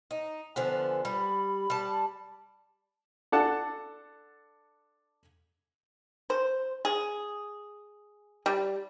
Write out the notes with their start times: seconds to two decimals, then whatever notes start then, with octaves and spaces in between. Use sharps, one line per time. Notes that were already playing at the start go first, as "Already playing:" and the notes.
0.11 D#4
0.56 D3 F3 B3 G#5
1.05 G3 B5
1.70 G3 A5
3.32 D4 A4 F#5 A5
6.30 C5
6.85 G#4
8.46 G3